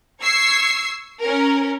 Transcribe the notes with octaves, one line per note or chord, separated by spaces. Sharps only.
C#6 E6 G#6 C7
C#4 A#4